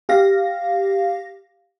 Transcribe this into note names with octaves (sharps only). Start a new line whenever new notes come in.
G4 F5 A#6